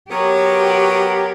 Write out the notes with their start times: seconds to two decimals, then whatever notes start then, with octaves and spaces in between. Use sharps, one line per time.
0.11 F#3 B3 G4 A#4 C#5